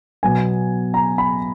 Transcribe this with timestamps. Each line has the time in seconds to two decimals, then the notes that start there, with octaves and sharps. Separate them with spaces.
0.23 B2 F#3 B3 G#5
0.94 A#5
1.18 B5